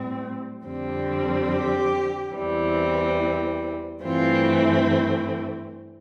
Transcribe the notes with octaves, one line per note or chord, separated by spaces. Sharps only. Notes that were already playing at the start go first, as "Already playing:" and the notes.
Already playing: A2 G3 C4
F2 D3 G3 C4
G4
E2 E3 G3 C4
G2 E3 A3 C4 F4